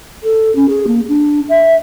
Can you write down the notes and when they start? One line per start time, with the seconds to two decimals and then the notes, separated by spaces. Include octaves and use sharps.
0.23 A4
0.55 C#4
0.69 G#4
0.87 A#3
1.08 D4
1.49 E5